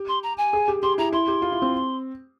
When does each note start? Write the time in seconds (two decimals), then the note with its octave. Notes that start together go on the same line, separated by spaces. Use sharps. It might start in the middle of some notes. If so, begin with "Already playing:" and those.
Already playing: G4
0.08 C6
0.22 A#5
0.37 G#5
0.53 G#4
0.68 G4
0.82 G4 C6
0.98 E4 A#5
1.12 E4 C6
1.28 G4
1.42 F4
1.52 E4
1.62 C4